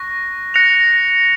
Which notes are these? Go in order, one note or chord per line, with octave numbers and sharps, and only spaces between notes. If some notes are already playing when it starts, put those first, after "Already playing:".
Already playing: C#6 F#6 A#6
F#6 A#6 C#7 F7